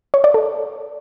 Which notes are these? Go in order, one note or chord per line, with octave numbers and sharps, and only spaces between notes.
C#5
D5
A4